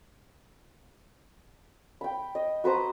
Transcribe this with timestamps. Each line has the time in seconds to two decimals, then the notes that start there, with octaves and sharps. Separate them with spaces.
2.01 G5 B5
2.35 D#5
2.64 F#4 B4 C5 A#5